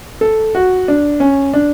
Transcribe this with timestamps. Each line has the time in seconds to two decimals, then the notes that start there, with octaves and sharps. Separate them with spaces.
0.21 A4
0.55 F#4
0.88 D4
1.20 C#4
1.54 D4